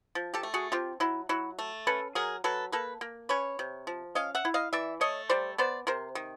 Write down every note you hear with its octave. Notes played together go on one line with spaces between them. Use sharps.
F3
G4 A4
A3
F#4 G#4
C4 F4 G4
F#3 E4
F#3 E4 F#4
A3
C#4 A4 B4
F#3 G#4 A#4
F#3 A4 B4
A#3 A4 B4
A#3
C#4 B4 C#5
C3
F3
C#4 D#5 F5
E5 F#5
E4
D#5 F5
E3 D5 E5
A3 C#5 D#5
G3 C5 D5
B3 C5 D5
C3 A#4 C5
D#3